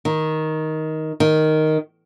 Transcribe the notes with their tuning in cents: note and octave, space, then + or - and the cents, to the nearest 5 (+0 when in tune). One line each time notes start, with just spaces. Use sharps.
D#3 +10
D#3 +0